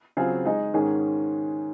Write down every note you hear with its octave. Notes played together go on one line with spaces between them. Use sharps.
C#3 F#3 C4 F4 G#4
G#3 D#4 G#4 D#5
G#2 D#3 G#3 C#4 G#4